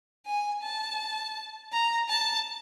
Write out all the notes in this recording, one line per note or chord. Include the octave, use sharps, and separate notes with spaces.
G#5
A5
A#5
A5